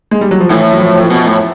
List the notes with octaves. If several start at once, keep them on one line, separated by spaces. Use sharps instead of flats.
G#3
G3
F#3
F3
A2 E3
F#3
F3
F3
B2
A2